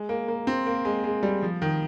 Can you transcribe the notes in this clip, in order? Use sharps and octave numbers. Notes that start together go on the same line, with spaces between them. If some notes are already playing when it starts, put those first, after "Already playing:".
Already playing: G#3
A#3
A#3
C4
A#3
G#3
G#3
G3
F3
D#3